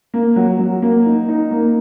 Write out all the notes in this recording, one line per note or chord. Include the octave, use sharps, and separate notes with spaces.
A#3
F#3
F#3
A#3
D#4
D#4
A#3